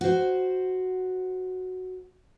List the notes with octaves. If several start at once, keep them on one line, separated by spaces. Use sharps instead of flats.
F#4 C5